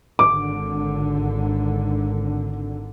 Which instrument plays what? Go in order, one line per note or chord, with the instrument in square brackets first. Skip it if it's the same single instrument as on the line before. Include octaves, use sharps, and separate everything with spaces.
[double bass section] G#1 D3 [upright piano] D6